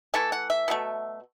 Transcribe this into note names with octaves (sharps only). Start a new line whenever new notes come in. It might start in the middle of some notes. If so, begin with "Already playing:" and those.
E3 A3 E4 A4
F#5
E5
B2 F#3 A3